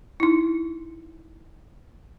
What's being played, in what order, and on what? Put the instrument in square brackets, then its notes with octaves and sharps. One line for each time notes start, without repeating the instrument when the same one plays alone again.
[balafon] D#4 E4